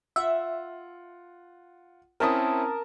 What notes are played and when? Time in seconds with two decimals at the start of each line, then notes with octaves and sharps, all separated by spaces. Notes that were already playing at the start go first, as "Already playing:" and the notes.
0.16 F4 E5 F#5
2.20 C4 C#4 E4 A#4 A5 D#6